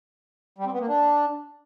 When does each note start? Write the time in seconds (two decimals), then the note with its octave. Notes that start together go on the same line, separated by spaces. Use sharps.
0.58 G3
0.66 C4
0.73 B3
0.80 A#3
0.88 D4